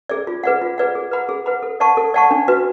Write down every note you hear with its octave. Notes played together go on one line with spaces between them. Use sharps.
G#4 D5
F4
G#4 B4 D5 F#5
F4
G#4 B4 D5 F#5
G#4
B4 F#5 B5
G#4
B4 F#5 B5
A4
D5 F#5 A5 C#6
A4
D5 F#5 A5 C#6
D4
F#4 B4